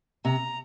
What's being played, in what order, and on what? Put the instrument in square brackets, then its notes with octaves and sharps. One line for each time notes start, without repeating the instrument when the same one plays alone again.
[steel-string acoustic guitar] C3 [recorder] A#5